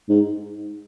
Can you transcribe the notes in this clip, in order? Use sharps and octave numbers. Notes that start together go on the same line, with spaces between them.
G#2